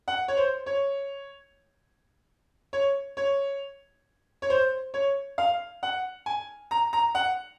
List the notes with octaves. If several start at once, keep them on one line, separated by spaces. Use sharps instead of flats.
F#5
C#5
C5
C#5
C#5
C#5
C#5
C5
C#5
F5
F#5
G#5
A#5
A#5
F#5